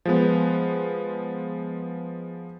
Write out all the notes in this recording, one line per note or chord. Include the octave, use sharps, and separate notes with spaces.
F3 G#3 B3